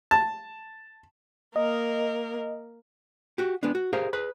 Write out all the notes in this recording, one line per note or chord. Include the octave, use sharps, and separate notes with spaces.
A5
A#3 A#4 D#5
F#4 G4
G#3 B3 D4
F#4
G4 G#4 A#4 C5 F5
G#4 B4 B5